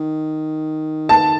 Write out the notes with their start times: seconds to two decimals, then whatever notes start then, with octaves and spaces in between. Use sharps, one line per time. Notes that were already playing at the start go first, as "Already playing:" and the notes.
Already playing: D#3
1.09 A5